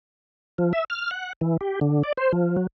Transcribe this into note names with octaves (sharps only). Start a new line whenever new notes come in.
F3
E5
F6
F#5
E3
G4
D3
D5
C5
F3
F#3